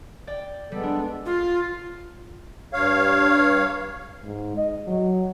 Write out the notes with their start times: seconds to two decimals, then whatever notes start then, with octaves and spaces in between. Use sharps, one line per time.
0.27 D5 G5
0.72 G3 G#3 B3 A4
0.83 D4
1.26 F4
2.73 G2 C#5 F5
4.24 G#2
4.57 D#5
4.87 F#3